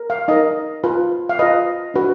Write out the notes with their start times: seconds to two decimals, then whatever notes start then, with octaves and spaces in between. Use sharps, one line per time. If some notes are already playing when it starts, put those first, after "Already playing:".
Already playing: A#4
0.10 F5
0.28 D#4 A#4 D#5
0.84 F4 B4
1.29 F5
1.39 F4 B4 D#5
1.94 D4 F#4 B4